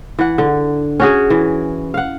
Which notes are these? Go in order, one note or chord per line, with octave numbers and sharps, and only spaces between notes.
E3 F#5
D3
C#4 F#4 G#4
E3
F5 F#5